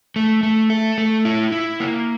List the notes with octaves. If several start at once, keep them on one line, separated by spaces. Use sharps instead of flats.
A3
A3
A4
A3
E4
E4
A#3